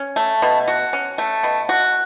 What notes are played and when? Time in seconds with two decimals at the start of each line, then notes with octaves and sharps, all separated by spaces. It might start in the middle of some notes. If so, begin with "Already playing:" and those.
Already playing: C#4
0.16 A3
0.42 B2
0.68 F#4
0.93 C#4
1.18 A3
1.43 B2
1.69 F#4